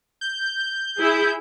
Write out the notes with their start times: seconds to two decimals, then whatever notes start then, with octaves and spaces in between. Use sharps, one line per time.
0.21 G6
0.98 E4 G#4